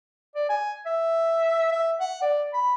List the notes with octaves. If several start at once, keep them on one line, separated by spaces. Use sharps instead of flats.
D5
G#5
E5
E5
F#5
D5
B5